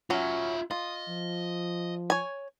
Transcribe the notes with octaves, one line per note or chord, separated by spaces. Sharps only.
F#3 C#4 F4 E5
F4 D#5
F3
C#5 G#5